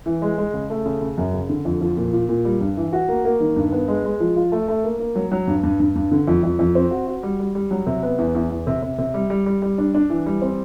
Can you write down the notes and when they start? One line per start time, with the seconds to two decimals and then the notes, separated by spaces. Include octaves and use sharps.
0.06 E3
0.22 G#3
0.38 G#3
0.54 C#3
0.70 A3
0.86 C#3
1.01 C#3
1.18 F#2
1.34 C#3
1.49 D3
1.65 F2
1.81 F3
1.97 A#2
2.13 A#2
2.29 A#2
2.45 G3
2.61 G2
2.77 E3
2.93 F#4
3.09 A#3
3.25 A#3
3.40 D#3
3.56 G2
3.72 B3
3.88 G#3
4.05 G#3
4.20 F3
4.36 F4
4.52 A3
4.68 A3
4.84 A#3
5.00 A#3
5.15 F#3
5.32 F#3
5.47 G2
5.63 G2
5.80 G2
5.96 G2
6.11 D3
6.28 F2
6.43 F2
6.59 F2
6.75 C4
6.91 F#4
7.07 F#4
7.23 G3
7.39 G3
7.55 G3
7.71 F#3
7.87 C3
8.03 B3
8.19 E2
8.35 E2
8.50 E2
8.67 C3
8.82 C3
8.98 C3
9.14 G3
9.30 G3
9.46 G3
9.62 G3
9.78 D4
9.94 D4
10.10 E3
10.26 G3
10.42 C4